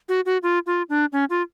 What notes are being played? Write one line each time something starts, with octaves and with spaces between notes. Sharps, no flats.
F#4
F#4
F4
F4
D4
C#4
F4